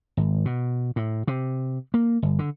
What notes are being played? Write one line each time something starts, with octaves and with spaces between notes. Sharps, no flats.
G#1
B2
A2
C3
A#3
G1
D3